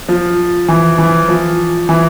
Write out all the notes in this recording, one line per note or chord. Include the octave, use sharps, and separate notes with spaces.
F3
E3
E3
F3
E3